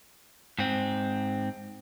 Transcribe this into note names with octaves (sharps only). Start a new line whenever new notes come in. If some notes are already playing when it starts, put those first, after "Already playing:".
G#2 C4